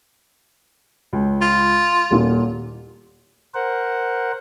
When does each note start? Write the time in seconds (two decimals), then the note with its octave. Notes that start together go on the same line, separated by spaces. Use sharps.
1.13 C#2
1.41 F4
2.11 D#1 A#2
3.54 A#4 C5 F#5